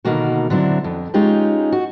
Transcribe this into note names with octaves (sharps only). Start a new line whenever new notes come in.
B2 D3 D#3 A#3 F#4
D3 F#3 C4 D4 E4
F2
G#3 C#4 D#4 F4 G4
F#4